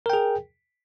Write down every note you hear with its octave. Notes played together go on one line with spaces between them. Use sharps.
G#4 A#4 G5